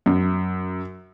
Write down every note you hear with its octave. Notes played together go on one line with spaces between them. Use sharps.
F#2